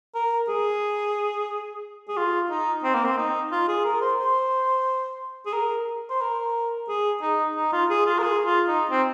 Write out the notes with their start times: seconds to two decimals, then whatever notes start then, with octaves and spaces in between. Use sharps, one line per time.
0.15 A#4
0.48 G#4
2.08 G#4
2.17 F4
2.50 D#4
2.84 C4
2.94 A#3
3.05 C4
3.17 D#4
3.52 F4
3.68 G#4
3.85 A#4
4.01 C5
4.19 C5
5.46 G#4
5.53 A#4
6.10 C5
6.21 A#4
6.89 G#4
7.22 D#4
7.56 D#4
7.73 F4
7.90 G#4
8.06 F4
8.19 A#4
8.23 G#4
8.46 F4
8.68 D#4
8.91 C4